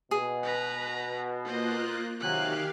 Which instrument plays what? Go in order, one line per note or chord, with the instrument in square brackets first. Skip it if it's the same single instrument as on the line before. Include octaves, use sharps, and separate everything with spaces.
[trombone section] B2 [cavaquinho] G#4
[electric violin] B4 A#5
[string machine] A#3 F4 F#6 [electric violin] C5 D#5
[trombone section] C3 F#3 [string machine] D#3 G4 F5 [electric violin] G#5 F#6